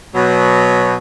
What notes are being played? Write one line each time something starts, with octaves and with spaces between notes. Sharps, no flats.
B2 F#3